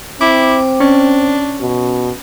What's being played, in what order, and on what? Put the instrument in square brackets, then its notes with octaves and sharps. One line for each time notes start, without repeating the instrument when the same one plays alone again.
[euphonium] C4 [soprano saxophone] E4 [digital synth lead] D6
[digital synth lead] C#4 [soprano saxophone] D4
[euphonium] B2